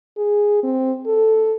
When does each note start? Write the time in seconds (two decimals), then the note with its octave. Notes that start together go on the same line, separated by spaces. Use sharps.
0.17 G#4
0.64 C4
1.06 A4